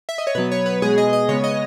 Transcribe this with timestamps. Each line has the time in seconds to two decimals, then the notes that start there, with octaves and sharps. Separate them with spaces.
0.09 E5
0.18 D#5
0.27 C#5
0.35 B2 F#3 B3 B4
0.52 C#5
0.66 B4
0.82 B2 G#3 B3 G#4
0.98 D#5
1.13 D#5
1.29 C#3 G#3 B3 C#5
1.44 D#5